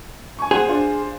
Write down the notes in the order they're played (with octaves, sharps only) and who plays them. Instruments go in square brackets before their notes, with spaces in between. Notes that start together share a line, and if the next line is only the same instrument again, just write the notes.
[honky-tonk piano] G#5 C#6
[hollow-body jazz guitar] G#4 [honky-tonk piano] C5 F#5
[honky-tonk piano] D4 F4 C5